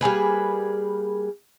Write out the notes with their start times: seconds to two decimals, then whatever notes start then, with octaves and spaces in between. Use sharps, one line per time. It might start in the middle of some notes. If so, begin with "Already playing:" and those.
0.01 G3 A#3 G#4 B4